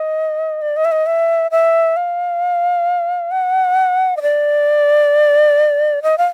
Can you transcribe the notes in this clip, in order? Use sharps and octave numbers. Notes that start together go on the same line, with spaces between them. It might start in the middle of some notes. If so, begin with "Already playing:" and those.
Already playing: D#5
D5
D#5
E5
D#5
E5
E5
F5
F#5
D#5
D5
D#5
F5